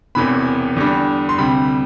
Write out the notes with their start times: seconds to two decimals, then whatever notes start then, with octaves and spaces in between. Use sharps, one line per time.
0.15 E1 E2 C3 E3 B3 B5
0.76 E2 D3 G3 D4
1.29 C6
1.38 D2 C3 G3 B5